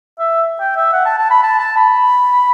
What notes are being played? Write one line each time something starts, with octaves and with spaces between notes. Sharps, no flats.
E5
G5
E5
F#5
A5
A5
B5
A5
A5
B5